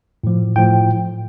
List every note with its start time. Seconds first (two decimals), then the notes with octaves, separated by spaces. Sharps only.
0.24 A2 F3
0.56 A2 F3 G5